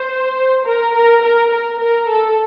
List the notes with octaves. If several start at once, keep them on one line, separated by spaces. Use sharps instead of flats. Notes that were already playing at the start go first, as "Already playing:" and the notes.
Already playing: C5
A#4
A#4
A#4
A#4
A#4
A4